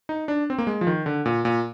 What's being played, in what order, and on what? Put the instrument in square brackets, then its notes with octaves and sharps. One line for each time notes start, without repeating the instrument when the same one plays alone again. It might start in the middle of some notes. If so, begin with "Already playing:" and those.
[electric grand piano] D#4
D4
C4
A#3
G#3
F3
D#3
D3
A#2
A#2